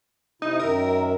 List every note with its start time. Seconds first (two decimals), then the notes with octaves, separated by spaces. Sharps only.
0.42 C3 D#4 E4
0.59 F#2 D#3 A#4 E5